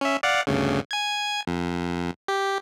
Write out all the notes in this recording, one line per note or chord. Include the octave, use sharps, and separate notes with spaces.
C#4 E5
D5 F5 F#5
G1 D2 C#3
G#5 G#6
F2
G4